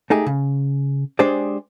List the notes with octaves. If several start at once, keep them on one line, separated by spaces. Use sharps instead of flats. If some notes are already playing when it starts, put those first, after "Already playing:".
A3 D#4 G4 G#4
C#3
G#3 D4 G4 G#4 C5 D5